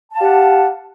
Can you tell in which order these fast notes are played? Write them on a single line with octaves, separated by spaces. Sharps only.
A5 F5 G4 F#5